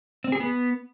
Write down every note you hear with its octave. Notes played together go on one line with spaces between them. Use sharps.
C4
G#4
B3